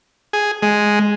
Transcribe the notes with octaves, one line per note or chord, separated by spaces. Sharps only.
G#4
G#3